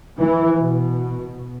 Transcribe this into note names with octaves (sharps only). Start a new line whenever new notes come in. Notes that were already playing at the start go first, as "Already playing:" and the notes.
E3
B2